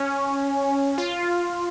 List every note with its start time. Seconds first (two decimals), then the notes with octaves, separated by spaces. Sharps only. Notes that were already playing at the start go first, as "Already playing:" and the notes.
Already playing: C#4
0.98 F4